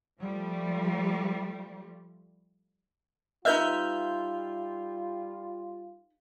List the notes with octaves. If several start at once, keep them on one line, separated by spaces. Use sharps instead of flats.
F3 G3 A3
G3 D#4 F4 B4 D#5 E5 F6 G6